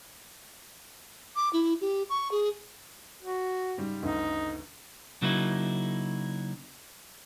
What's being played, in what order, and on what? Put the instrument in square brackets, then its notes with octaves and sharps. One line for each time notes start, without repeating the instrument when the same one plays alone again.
[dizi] D6
E4
G4
C#6
G#4
[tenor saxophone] F#4
[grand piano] G#2 C#3 G3
[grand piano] G1 D2 C#3 [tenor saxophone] D#4
[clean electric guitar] C#3 F#3 A#3 D#4 E4